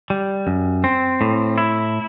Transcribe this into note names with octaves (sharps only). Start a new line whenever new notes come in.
G3
F#2
C4
A2
E4